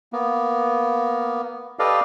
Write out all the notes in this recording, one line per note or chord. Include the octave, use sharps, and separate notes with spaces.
A#3 B3
G4 A4 B4 D5 D#5 F5